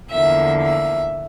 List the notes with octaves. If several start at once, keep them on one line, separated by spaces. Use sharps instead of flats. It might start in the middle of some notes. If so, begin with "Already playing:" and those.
E2 D3 F3 A#3 E5
E5